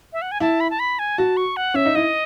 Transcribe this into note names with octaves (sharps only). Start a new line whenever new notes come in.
E5
F#5
G#5
E4 A5
B5
A5
B5
G#5
F#4 A5
C#6
F#5
C#4 E5
D#4
E4 D#5